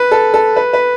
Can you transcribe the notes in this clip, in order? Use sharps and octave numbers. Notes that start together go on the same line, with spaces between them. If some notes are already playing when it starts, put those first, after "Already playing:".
Already playing: B4
A4
A4
B4
B4